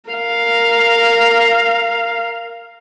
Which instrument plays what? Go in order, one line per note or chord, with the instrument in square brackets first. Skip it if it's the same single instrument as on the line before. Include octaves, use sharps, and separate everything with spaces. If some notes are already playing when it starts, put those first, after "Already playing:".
[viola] A#4 F5